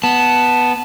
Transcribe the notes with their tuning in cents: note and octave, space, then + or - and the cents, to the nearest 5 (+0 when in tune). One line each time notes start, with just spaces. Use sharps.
B3 +0 A5 +0